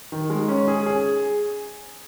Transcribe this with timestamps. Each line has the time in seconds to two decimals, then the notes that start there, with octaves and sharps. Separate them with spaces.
0.12 D#3
0.30 G#3
0.48 C#4
0.68 G#4
0.86 G#4